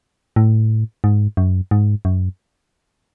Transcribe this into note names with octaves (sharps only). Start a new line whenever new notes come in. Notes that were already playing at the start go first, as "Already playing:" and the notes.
A2
G#2
F#2
G#2
F#2